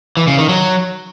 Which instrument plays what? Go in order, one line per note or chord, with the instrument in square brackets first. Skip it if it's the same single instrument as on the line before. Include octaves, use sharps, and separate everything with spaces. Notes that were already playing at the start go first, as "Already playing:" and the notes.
[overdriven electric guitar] E3
C#3
D#3
F#3